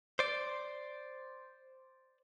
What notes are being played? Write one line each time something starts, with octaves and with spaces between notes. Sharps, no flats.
C5 D5